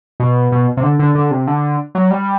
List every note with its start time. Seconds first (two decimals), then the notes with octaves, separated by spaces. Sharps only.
0.20 B2
0.52 B2
0.77 C3
0.83 D3
0.99 D3
1.15 D3
1.31 C3
1.47 D3
1.95 F#3
2.11 G3